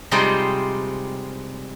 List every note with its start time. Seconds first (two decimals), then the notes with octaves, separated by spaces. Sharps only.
0.11 C3 G3 G#3 D#4 F4 C5